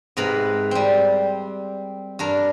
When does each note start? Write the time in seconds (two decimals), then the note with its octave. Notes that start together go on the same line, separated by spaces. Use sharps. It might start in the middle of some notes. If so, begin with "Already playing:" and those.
0.17 G#2 C3 A#4 B4 B5
0.71 G3 C4
2.19 G2 D4 A#4